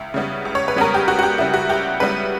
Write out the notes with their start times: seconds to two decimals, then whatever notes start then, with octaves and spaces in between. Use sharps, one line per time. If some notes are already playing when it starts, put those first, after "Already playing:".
Already playing: C#2 E4
0.14 C#3 G3 B3
0.45 C#2
0.55 C#5
0.68 B4
0.76 C#3 G3 B3 A#4
0.94 G4
1.08 C#2 F#4
1.19 F#4
1.23 G4
1.38 C#3 G3 B3 E4
1.54 F#4
1.69 C#2 G4
2.00 C#3 G3 B3 B4